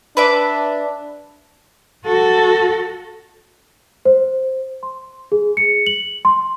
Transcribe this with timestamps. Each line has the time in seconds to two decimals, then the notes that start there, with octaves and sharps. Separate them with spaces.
0.17 D4 B4 E5 D6
2.05 F#4 A4
4.05 C5
4.83 C6
5.32 G#4
5.57 C#7
5.86 F#7
6.25 C6